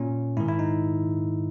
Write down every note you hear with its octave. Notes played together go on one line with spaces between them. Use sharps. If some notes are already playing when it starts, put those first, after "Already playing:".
Already playing: A#2 C#4
G#2 D#3 E4
E4
D#4